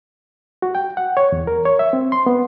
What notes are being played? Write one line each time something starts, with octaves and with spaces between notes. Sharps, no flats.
F#4
G5
F#5
C#5
E2
A#4
C#5
E5
C4
C6
B3